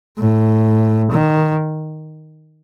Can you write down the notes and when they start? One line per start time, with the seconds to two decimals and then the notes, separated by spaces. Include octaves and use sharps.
0.18 A2
1.11 D#3